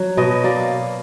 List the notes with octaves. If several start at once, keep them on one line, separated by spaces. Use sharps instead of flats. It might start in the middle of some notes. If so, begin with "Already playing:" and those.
Already playing: F#3
B2 D#5
A#3 D5